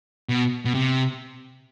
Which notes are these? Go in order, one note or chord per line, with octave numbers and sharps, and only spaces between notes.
B2
B2
C3